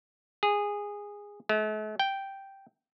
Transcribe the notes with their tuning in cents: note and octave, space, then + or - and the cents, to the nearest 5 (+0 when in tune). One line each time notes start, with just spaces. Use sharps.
G#4 -15
A3 -45
G5 -5